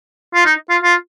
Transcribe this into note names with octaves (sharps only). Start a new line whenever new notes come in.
F4
D#4
F4
F4